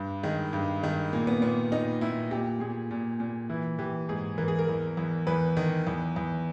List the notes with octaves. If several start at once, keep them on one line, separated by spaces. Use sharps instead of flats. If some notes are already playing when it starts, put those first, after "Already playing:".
Already playing: G2
D#3 G#3
G2
D#3 G#3
A#2 A#3
B3
A#2 B3
A#2 D#4
A#2 E4
A#2 G4
A#2 G#4
A#2
A#2
E3 E4
E3 G4
G#2 G#4
E3 A#4
G#4
A#4
E2
E2
E2 B4
D#3
E2
E2